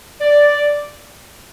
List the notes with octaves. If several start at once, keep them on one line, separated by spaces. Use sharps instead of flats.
D5